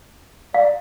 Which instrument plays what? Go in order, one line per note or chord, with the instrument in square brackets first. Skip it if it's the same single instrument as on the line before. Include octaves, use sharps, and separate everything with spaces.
[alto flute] D5 [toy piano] F5